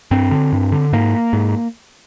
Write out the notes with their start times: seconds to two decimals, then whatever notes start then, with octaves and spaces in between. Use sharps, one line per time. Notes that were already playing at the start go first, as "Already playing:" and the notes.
0.11 G2 C4
0.31 D3
0.53 G2
0.72 D3
0.93 G#2 A#3
1.33 G#2